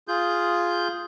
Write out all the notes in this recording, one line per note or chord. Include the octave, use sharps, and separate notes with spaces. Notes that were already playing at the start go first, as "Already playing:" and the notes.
F4 G#4 G6